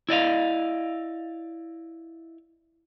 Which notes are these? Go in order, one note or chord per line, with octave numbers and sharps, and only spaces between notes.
E4 D5 D#5 F5